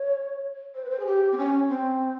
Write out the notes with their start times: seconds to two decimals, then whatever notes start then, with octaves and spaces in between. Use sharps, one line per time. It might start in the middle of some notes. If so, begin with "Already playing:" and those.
Already playing: C#5
0.75 C5
0.85 B4
0.90 C5
1.00 G#4
1.06 G4
1.32 C4
1.37 C#4
1.69 C4